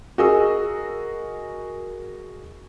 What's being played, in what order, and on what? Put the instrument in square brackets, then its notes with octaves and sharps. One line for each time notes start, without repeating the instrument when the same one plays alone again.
[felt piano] F#4 G#4 A#4 D#5 D#6 E6